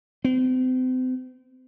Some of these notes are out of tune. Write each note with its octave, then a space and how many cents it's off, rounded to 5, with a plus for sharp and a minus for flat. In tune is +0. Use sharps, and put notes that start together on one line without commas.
C4 -35